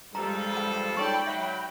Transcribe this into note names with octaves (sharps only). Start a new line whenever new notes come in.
G2 F3 G3 G#3 A4 A#5
F#5
D#4 A4 C#5 D5 G5 B5 C#6
F#3 E5